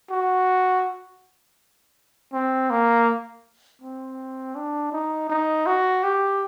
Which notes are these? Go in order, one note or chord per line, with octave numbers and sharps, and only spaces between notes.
F#4
C4
A#3
C4
D4
D#4
D#4
F#4
G4